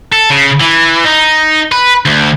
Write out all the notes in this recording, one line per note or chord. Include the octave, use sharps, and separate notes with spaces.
A4
C#3
E3
D#4
B4
D2